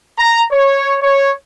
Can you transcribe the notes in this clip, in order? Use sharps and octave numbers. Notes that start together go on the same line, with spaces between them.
A#5
C#5
C#5